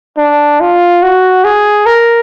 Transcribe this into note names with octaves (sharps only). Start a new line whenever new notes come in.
D4
F4
F#4
G#4
A#4